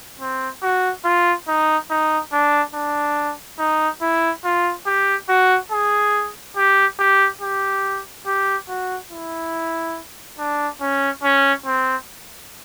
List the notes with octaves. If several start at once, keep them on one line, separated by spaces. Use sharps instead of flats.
C4
F#4
F4
D#4
D#4
D4
D4
D#4
E4
F4
G4
F#4
G#4
G4
G4
G4
G4
F#4
E4
D4
C#4
C#4
C4